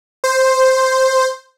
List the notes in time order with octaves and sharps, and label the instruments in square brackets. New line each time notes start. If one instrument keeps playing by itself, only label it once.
[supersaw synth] C5